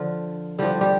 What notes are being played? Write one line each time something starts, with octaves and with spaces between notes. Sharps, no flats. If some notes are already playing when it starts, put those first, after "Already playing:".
Already playing: D3 F3 F4
D3 F3 G3 G4
G3 G4